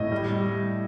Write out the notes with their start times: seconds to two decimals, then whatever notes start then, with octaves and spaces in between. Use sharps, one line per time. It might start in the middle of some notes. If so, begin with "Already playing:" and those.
Already playing: A2 D#5
0.12 G3
0.29 G3